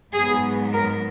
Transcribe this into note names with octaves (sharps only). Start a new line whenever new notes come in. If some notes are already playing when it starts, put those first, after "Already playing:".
G#2 F#3 B3 G#4
A#4